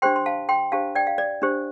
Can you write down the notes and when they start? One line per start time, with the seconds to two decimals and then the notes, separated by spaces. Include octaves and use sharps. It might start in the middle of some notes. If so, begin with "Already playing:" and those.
0.02 D4 G4 C5 G5 C6
0.16 C6
0.26 F5 A5
0.49 G5 C6
0.72 D4 G4 C5 F5 A5
0.95 D5 G5
1.07 F5
1.18 D5
1.42 D4 G4 C5